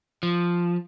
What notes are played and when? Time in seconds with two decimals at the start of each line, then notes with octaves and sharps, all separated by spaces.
0.23 F3